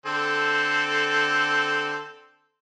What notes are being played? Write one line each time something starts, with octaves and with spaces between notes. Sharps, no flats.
D3 C4 A4